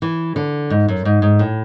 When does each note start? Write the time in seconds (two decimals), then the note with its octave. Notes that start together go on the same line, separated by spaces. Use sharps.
0.02 E3
0.36 D3
0.70 G#2
0.88 F#2
1.05 G#2
1.22 G#2
1.39 A2